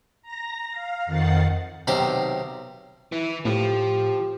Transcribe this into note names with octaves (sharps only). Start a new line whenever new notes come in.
A#5 A#6
F5
F2 D#3 F#5 A6 C7
B1 C3 D#3 G4 C5
E3 E4
A2 F3 G4